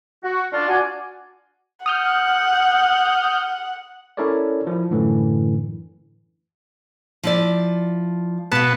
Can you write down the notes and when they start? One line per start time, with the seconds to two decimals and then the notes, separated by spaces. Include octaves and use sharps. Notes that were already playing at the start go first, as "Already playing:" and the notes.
0.24 F#4
0.52 D4 F4
0.68 F#4 D5 G#5
1.86 F#5 D#6 F6 G6
4.17 C#4 E4 A4 A#4 C#5 D5
4.67 F3 E4
4.91 F#2 A2 D3 E3
7.23 F3 E4 D5
8.52 B2 B3 F5 A5